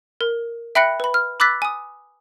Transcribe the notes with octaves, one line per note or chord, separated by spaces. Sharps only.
A#4
E5 G5 B5 F#6 A#6 C#7
B4 B5
F6
B5 D6 E6 F#6 A6 B6
G#5 D#6